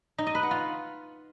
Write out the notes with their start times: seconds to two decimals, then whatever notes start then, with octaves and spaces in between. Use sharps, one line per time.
0.18 D#4
0.27 D#5
0.35 B4
0.43 F#5
0.51 F4